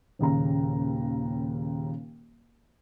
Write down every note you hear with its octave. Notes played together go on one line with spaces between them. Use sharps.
D#1 D#2 C#3 A#5